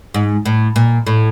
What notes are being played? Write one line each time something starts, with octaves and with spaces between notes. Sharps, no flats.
G#2
A2
A#2
A2